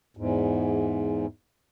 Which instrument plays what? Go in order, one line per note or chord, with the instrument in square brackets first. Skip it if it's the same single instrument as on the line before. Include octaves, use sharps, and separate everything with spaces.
[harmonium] E2 G#2